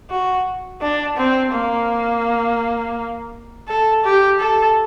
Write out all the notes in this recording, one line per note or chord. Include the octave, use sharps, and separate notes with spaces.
F#4
D4
C4
A#3
A4
G4
A4